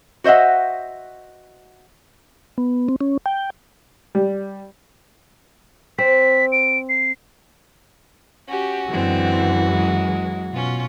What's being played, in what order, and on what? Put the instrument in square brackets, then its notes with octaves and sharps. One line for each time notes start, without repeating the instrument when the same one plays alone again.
[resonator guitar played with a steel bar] F#4 C5 D#5 E5 F#5
[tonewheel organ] B3
C4
C#4
G5
[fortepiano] G3
[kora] C4 [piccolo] B6
[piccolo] D7
C7
[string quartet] C#4 G4 [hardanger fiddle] F#4
[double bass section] F#2 E3 [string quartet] D3 G#3 C4
[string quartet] F#3 G#3
[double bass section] B2 [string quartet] C#4 F4